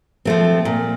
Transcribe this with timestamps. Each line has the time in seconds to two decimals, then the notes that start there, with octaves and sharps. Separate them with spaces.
0.25 F3 A3 C4
0.65 A#2